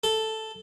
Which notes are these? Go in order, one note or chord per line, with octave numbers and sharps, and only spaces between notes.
A4